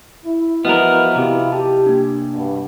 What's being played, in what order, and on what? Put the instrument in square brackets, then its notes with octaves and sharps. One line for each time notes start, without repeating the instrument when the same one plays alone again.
[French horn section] E4
[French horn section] E3 F3 [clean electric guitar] B3 A#4 [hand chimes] F#4 D#5 F6
[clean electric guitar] C3 [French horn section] E4 F4 G4
[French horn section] G4 [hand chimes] A5
[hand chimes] A#3 D4
[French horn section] G2 B2